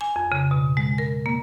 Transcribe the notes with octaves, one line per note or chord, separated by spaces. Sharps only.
G#5
F2
C#3
B2
G#3
A#4
A#3